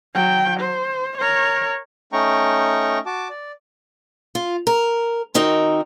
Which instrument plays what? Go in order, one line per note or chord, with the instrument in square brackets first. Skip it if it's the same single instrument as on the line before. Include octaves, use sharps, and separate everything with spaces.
[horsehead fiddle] F#3 G5
C5
A#4 C#5
[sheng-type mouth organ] A3 C#4 D#4 G5 A#5 C#6
F#4 A5 D6
D5
[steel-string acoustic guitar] F4
A#4
D#3 C4 D#4 F#4 A#4 G5